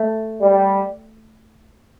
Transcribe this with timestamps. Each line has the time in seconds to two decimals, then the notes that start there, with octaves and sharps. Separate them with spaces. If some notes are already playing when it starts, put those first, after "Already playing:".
Already playing: A3
0.41 G3